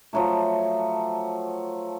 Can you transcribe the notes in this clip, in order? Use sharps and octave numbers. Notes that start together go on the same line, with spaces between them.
F3 F#3 A3